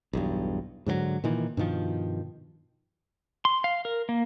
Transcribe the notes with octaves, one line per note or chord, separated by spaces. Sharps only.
B1 E2 G2
G#2 D3 D#3 F#3
A#2 D#3 E3
G2 B2 D#3 F3
C6
F5
A#4
A#3